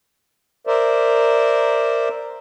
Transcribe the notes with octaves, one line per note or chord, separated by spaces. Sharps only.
A#4 C5 D5 E5